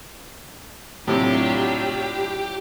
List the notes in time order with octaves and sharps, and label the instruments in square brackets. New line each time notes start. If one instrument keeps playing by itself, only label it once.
[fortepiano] A2 C3 [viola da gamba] F#3 D4 F4 [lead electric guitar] G4